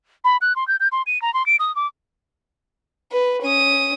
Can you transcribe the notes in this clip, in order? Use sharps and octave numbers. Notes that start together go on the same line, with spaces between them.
B5
F#6
C6
G6
G6
C6
D#7
A#5
C6
D7
D#6
D6
B4
C#4 D#6